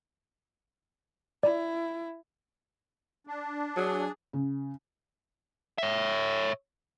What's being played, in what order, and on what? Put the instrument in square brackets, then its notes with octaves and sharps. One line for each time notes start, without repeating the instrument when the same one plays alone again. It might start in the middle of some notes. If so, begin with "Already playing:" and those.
[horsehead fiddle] E4 [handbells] D5
[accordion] D4
[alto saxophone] F#3 [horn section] G#4
[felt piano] C#3
[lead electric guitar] C#5 E5